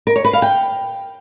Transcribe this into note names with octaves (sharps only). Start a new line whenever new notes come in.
A#4
C#5
B4
F5
G5